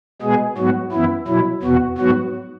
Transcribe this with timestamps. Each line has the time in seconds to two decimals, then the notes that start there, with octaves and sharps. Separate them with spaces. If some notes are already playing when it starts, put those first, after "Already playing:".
0.22 B2 G#3 B3 G#4
0.57 G#2 F#3 B3 F#4
0.92 F#2 E3 B3 E4
1.28 B2 F#3 E4
1.63 E2 B2 B3 F#4
1.98 G#2 F#3 B3 F#4